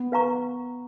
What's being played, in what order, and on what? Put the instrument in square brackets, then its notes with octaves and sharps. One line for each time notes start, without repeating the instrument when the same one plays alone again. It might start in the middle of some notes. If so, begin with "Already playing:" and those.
Already playing: [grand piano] B3
[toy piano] B4 F5 A#5 C#6